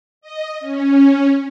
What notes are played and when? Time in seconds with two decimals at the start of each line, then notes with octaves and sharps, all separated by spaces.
0.21 D#5
0.60 C#4